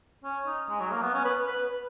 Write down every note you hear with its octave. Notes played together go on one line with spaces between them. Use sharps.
C#4
D#4
G#3
F#3
A#3
B3
C#4
B4
B4